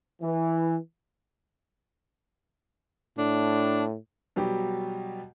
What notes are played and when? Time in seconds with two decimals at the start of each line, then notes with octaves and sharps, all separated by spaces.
0.22 E3
3.18 A2 D4
4.36 B2 F#3 G3 G4